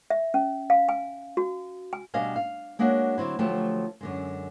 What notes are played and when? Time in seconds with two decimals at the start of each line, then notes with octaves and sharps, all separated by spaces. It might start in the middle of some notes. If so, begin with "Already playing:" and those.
0.10 E5
0.34 C#4
0.70 F5
0.89 G#5
1.37 F#4
1.93 G#5
2.14 B2 G3 D4 D#5 F5 G#5
2.36 F5
2.79 G#3 A#3 D4 F#4 C#5 F#5
3.18 D3 F#3 C4 E4
3.39 D2 F3 F#3 A3 G4 A4
4.01 F#2 D3 G#3